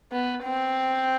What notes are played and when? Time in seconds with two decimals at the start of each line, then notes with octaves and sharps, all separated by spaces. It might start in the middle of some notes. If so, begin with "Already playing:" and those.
0.12 B3
0.44 C4